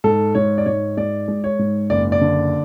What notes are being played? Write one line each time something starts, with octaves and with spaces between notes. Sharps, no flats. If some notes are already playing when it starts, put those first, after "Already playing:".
G#2 A4
G#2 C#5
D5
G#2 C#5
G#3 D5
G#3
C#5
G#2
F#1 D5
D5
D3